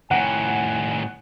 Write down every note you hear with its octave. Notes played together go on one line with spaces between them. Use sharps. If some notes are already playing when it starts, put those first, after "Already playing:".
A2 D#3 F#5 G#5